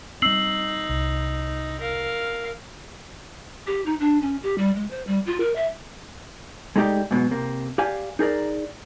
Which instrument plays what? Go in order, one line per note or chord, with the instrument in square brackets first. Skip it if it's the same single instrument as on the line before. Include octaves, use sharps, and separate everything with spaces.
[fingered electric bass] G3 C4 [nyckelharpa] D#4 [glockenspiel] E6 C7 F#7
[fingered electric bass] C2
[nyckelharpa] A#4 F5
[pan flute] G4
D#4
D4
C#4
G4
G3
G#3
C5
G3
F4
A#4
E5
[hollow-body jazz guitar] G#3 A3 D#4 F#4 G4 D5
G#2 B2 E3 F#3
C3 A#3
G4 D5 F5 G#5
D#4 G#4 A#4 D5